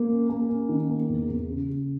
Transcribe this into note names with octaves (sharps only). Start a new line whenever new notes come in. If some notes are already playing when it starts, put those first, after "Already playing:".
Already playing: A#3
C#4
A#3
C#4
D#3
A#3
E2
E2
C#3
C#3